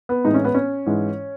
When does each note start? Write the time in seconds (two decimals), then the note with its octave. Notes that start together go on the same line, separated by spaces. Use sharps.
0.09 B3
0.25 A2 E3 G#3 D#4
0.34 C#4
0.44 B3
0.54 C#4
0.86 G#2 E3 G#3